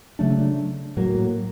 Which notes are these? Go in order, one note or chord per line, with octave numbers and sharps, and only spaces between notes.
C#3 F#3 A3 D4
A2 F#3 A#3